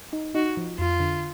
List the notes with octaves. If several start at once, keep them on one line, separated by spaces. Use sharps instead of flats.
D#4
D#4 F#4
F3
F2 F4
D3